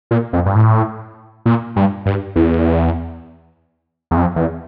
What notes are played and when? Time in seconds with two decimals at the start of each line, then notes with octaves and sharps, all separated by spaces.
0.11 A#2
0.33 F2
0.46 G2
0.55 A2
1.46 A#2
1.76 G2
2.06 G2
2.36 E2
4.11 E2
4.17 F2
4.36 E2